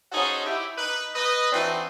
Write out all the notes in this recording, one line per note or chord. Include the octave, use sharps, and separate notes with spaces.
C#4 D#4 F#4 G#4 A4 C5
E4 G4 G5
D#4 B4
B4 D#5
E3 C4 D4 D#4 F#4